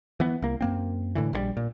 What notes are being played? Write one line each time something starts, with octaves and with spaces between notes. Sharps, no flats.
E3 B3
C2 A#3
F#2 A#3 C4
A2 D3 E3
A#1 C#3 G3
A#2